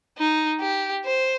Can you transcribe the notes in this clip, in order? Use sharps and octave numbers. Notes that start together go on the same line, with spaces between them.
D#4
G4
C5